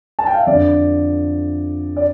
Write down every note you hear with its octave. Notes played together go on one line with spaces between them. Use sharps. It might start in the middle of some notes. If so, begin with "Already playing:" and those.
A5
G5
F5
E5
F2 D3 D5
D5